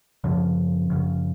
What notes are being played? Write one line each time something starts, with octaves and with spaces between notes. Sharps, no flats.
F#2 C#3 F3
F#2 C#3